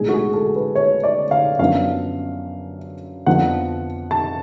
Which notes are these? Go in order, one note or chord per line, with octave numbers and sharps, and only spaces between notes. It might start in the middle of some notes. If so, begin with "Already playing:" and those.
Already playing: B1 A2 G#3 D4 G#4
F#4
G#4
A4
B4
C#5
D5
F5
F#2 F3 B3 D4 F5
F2 F3 B3 D4 F#5
A5